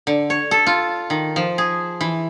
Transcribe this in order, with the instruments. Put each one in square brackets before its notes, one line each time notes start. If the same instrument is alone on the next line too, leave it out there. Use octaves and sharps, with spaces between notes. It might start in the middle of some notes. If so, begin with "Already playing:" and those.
[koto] D3
C#5
A4
F4
D#3
F3
G#4
E3